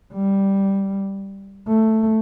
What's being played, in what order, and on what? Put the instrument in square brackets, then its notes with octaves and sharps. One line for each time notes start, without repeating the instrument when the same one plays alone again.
[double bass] G3
A3